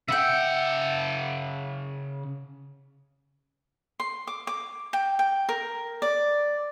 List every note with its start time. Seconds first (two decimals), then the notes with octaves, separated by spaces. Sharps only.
0.08 C#3 E5 F#5 G5
4.00 C6
4.27 D6
4.47 D6
4.93 G5
5.19 G5
5.49 A#4
6.02 D5